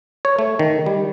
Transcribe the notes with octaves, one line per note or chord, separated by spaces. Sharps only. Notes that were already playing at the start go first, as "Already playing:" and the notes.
C#5
A3
D#3
G3